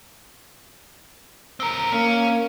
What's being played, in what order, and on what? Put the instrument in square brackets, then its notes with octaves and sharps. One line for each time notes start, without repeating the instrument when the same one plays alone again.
[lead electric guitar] C4 A#4
[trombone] A#3 [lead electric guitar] C#4